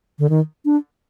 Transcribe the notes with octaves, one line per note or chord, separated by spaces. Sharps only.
D3
D#3
D4